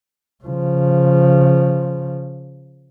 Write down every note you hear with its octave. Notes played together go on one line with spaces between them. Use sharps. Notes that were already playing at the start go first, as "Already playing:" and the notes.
C#3 F3